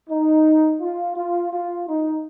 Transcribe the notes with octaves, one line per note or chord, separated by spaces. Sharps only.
D#4
F4
F4
F4
D#4